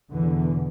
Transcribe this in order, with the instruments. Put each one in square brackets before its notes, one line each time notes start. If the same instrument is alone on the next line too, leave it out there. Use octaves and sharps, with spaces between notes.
[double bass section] E2 B2 D3 E3